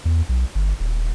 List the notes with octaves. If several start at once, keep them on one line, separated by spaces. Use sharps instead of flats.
E2
B1
G1
D#1